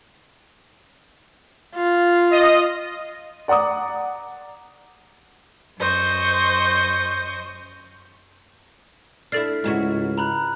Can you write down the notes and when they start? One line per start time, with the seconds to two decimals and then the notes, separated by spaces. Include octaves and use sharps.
1.76 F4
2.32 D#5
3.48 D5 F#5 A#5 D6 D#6
5.78 F#2 C5 D#5 C#6
9.32 D4 E4 A4 F6 A6 C7
9.64 C#2 G#2 E4 F#4
10.18 A#5 B5 F#6